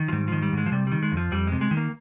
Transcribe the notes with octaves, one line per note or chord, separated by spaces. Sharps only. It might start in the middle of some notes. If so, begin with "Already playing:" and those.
Already playing: D#3
F3
G#2 G3
D#3 F3
G3
G#2 G#3
F3
C3 G3
D#3 G3
G#3
F2
F3
F2 G3
G#3
C3
G#3
D#3
A#3